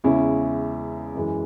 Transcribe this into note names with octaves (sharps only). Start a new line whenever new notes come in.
E2 C#3 G#3 C#4 E4
F#2 E3 G#3